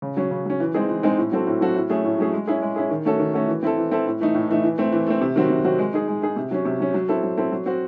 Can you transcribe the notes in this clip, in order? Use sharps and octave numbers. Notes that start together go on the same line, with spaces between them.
C#3
F#3 C#4
C#3
F#3 C#4
E3
G#3 C4 D#4 G#4
E3
G#3 C4 D#4 G#4
A2
F#3 C4 F#4 A4
A2
F#3 C4 F#4 A4
A2
F#3 A3 C#4 G#4
A2
F#3 A3 C#4 G#4
G#3
C#4 E4 G#4
G#3
C#4 E4 G#4
D#3
A3 C#4 F#4 A4
D#3
A3 C#4 F#4 A4
E3
C4 E4 A4
E3
C4 E4 A4
A2
E3 A3 D#4
A2
E3 A3 D#4
E3
A3 C4
E3
A3 C4
C3
D#3 F#3 C4 F#4
C3
D#3 F#3 C4 F#4
G#3
D#4 G#4
G#3
D#4 G#4
C3
F#3 C#4
C3
F#3 C#4
F#3
C4 E4 A4
F#3
C4 E4 A4
F#3
C4 F#4